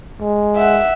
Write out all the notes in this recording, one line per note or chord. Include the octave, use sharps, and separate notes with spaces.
G#3
E5 F#5